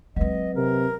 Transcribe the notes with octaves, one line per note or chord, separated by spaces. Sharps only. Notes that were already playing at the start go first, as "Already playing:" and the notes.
F#3 G#3 C4 B4 D#5
C3 A#4